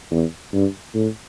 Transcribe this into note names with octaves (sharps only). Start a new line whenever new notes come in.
E2
G2
A2